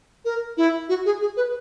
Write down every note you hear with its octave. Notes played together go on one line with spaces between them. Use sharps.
A#4
E4
F#4
G#4
G#4
B4